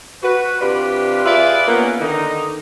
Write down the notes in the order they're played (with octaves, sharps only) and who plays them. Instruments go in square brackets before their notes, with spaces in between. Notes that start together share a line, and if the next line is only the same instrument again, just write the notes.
[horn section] F#4 B4
C3 D4 F4 G4 B4
F4 G#4 B4 D5 E5
A#3 B3 C#4
D3 D#3 D#4